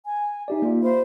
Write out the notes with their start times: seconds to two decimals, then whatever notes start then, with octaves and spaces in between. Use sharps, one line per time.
0.05 G#5
0.48 D#4 G4 D5 E5
0.62 A#3 F4
0.82 C5 F5 B5